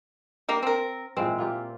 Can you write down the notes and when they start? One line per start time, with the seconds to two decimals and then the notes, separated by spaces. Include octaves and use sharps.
0.49 G3 A#3 A#4
0.63 C4 A#4
1.17 A#2 E3 G#3 C4
1.38 A#3 F4 G4